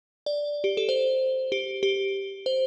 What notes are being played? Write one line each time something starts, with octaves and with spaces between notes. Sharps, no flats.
D5
G4
A4
C5
G4
G4
C5